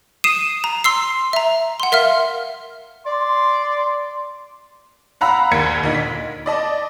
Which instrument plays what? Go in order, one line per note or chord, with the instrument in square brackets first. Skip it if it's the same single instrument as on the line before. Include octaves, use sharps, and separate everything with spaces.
[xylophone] D#6 C7 D#7 E7
A#5
C6 E6 C7
E5 A#5
F#5 C6
A#4 E5 F5 F6
[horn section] D5 C6
[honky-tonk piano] F5 F#5 A#5 B5 E6
A#1 D#2 A#4 G#6 C#7
D2 A#2 D#4
B6
D5 D#5 A5